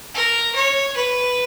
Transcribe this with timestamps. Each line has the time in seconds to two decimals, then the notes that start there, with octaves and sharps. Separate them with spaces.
0.15 A#4
0.55 C#5
0.97 B4